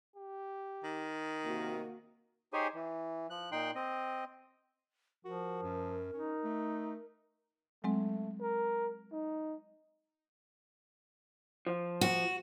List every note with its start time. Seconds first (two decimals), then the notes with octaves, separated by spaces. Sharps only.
0.16 G4
0.84 D#3
1.44 C3 A#3 F#4
2.53 D#4 G4 G#4 C5 C#5 G#5
2.75 E3
3.30 F3 F#6
3.52 A#2 D#4 G5 C6 F#6
3.75 C4 D#5
5.25 F3 F#4 A#4
5.63 F#2
6.13 C#4 D#4
6.44 A3
7.84 F#3 G#3 A3 C4
8.41 A#4
9.12 D#4
11.67 F3
12.01 F#4